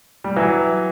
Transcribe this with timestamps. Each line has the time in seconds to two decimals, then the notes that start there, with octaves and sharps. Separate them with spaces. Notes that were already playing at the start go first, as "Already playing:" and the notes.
0.24 G3
0.36 E3 F#3